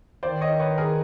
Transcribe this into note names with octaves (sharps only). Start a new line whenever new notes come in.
D#3 C5 D5
C#5 D#5
B4 C#5
G#4 A#4